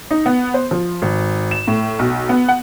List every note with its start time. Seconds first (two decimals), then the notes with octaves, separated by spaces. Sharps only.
0.11 D#4
0.26 B3
0.54 C5
0.71 F3
1.02 G#1
1.51 E7
1.67 A2
1.99 B1
2.29 B3
2.49 F#5